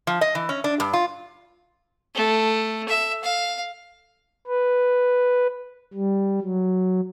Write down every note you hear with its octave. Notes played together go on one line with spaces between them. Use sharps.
F3
D#5
E3
C#4
D4
G2
F4
A3
E5
F5
B4
G3
F#3